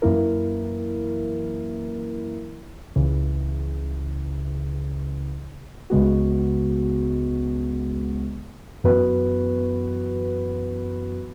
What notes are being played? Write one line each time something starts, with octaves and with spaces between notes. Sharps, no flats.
F#2 E3 A#3 E4 A#4
C#2 C#3 E3
C#2 C#3 G#3 B3 F#4
F#2 E3 B3 F#4 B4